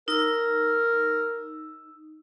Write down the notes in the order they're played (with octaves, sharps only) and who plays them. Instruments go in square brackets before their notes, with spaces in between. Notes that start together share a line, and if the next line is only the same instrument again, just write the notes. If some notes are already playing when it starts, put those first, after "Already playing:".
[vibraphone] D#4 E6 [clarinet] A#4